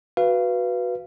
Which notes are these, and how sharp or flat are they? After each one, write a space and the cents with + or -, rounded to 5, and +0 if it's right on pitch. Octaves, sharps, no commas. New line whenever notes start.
F#4 +0 B4 +0 F5 -25